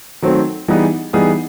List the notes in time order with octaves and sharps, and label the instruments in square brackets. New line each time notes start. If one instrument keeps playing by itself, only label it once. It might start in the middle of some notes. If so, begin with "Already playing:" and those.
[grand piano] D#3 F#3 A3 C4
E3 G3 B3 D#4 G#4
E3 G3 B3 D#4 G#4